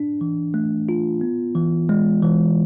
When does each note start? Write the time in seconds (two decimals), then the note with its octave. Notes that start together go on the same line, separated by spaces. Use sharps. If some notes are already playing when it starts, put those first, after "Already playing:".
Already playing: D4
0.21 E3
0.54 A3
0.89 F4
1.21 B3
1.55 E3
1.89 G#3
2.22 E3